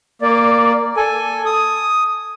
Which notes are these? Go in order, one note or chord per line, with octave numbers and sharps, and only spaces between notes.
A#3 D5
A4 G#5
D#6